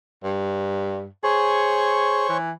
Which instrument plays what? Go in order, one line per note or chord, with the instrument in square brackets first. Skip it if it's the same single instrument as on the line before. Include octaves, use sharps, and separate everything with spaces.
[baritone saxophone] G2
[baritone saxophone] G#4 [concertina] C5 C#5 C#6
[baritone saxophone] E3